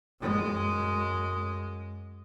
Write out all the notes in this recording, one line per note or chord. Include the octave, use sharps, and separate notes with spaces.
F#2 G#3